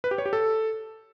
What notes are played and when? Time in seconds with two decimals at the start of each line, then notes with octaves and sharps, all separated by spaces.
0.04 B4
0.11 G4
0.18 C#5
0.26 G4
0.33 A4